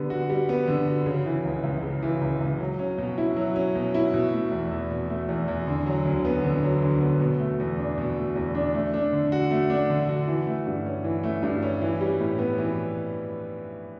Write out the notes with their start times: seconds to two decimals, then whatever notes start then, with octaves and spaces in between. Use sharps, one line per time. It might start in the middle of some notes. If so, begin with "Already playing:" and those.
Already playing: D3 G3 B3
0.10 F#4
0.30 G3
0.49 B3
0.68 D3
0.88 F#4
1.06 C#3
1.26 E3
1.45 C#2
1.64 C#2
1.83 C#3
2.03 E3
2.21 C#2
2.41 C#2
2.60 F#3
2.79 C#4
2.98 B2
3.18 E4
3.36 F#3
3.56 C#4
3.75 B2
3.94 E4
4.14 B2
4.33 A3
4.51 E2
4.71 E2
4.91 B2
5.10 A3
5.29 E2
5.48 E2
5.67 D3
5.86 F#3
6.05 D2
6.25 B3
6.44 D3
6.63 F#3
6.82 D2
7.01 B3
7.20 B2
7.40 A3
7.60 E2
7.78 D4
7.98 B2
8.17 A3
8.36 E2
8.55 D4
8.74 A3
8.94 D4
9.13 D3
9.32 F#4
9.51 A3
9.70 D4
9.90 D3
10.09 F#4
10.28 E3
10.47 A3
10.66 G2
10.86 C#4
11.04 E3
11.23 A3
11.43 G2
11.63 C#4
11.82 E3
12.01 G3
12.20 A2
12.39 B3
12.58 E3